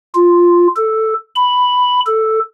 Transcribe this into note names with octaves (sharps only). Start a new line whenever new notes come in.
F4
A4
B5
A4